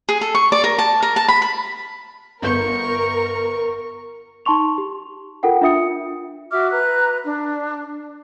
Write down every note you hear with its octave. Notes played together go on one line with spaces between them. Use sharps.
G#4
A4
C#6
D5
A#4
A5
A#4
A5
B5
B5
G1 B3 A#4 C#6 G6
D#4 A5 C6 C#6 F7
G4
F4 A4 A#4 F#5 G5
D4 F4 E5 D#6 C#7
F#4 E5 D6 F6
B4 A#5 F#6
D4